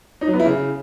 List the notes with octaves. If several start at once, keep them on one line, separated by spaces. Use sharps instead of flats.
D#4
F#3
B3
E4
C#3